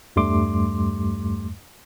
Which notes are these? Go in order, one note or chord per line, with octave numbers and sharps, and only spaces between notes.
E2 G2 G3 A3 C6 D6